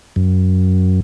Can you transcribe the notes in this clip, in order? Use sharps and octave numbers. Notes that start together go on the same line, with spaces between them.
F#2